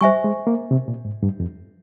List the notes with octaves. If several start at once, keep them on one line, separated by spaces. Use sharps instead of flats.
G3 C5 E5 G#5 C#6
G#3
A#3
C3
A#2
G#2
G2
F2